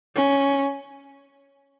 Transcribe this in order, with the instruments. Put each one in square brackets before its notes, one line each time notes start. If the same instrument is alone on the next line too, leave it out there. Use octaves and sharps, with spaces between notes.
[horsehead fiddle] C#4